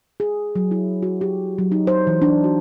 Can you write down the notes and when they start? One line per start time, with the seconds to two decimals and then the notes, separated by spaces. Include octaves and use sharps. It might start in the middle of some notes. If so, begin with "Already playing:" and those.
0.20 G#4
0.55 F#3
0.71 E4
1.03 F#4
1.21 G4
1.58 F#3
1.72 D#4
1.87 C5
2.07 E3
2.22 D4
2.44 F#4